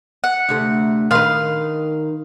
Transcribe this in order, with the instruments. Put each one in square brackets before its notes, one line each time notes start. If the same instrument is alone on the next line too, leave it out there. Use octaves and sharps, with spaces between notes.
[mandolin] F#5
[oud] D2 C3 A3
[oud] D#3 B4 [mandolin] F5 C6